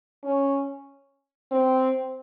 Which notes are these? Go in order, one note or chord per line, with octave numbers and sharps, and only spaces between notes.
C#4
C4